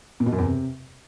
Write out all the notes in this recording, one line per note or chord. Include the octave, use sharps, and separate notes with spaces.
A#2
B2
F#2
E2
C3